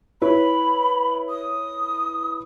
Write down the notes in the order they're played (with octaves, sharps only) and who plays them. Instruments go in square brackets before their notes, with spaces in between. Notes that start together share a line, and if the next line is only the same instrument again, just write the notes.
[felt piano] E4 B4 C#5 [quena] B5
[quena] D#6